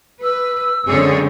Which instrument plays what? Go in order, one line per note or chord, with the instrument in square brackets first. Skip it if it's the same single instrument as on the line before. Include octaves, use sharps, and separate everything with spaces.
[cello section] B4 [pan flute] E6
[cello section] F#2 G#4 C#5 [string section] D3 G#3 C4